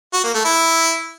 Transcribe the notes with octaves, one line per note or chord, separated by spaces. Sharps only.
F#4
A#3
A3
E4